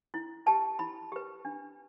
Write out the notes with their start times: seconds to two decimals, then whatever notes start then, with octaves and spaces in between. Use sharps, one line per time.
0.14 E4
0.46 G4 B4 A5
0.79 E4 B5
1.12 G4 B4
1.45 D4